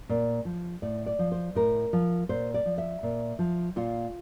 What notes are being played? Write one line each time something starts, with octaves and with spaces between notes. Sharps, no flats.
A#2
F3
A2 D5
D5
F3
C5
A2 A#4
F3
A#2 C5
D5
F3
E5
A#2
F3
A#2 F4